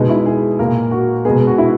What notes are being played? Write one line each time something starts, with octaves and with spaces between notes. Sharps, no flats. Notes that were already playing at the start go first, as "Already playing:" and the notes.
Already playing: B2 G#3 B3 D#4
E4
G#4
A#2 A#3 A#4
F#4
B2 G#3 B3 G#4
F#4
E4